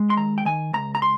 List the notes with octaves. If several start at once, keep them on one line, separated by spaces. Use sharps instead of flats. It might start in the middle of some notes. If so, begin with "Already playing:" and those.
Already playing: G#3
C6
D#2 A#5
G5
D#3 G#5
C#2 A#5
A#5
C6